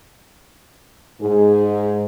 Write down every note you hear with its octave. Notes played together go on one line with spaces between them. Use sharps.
G#2 G#4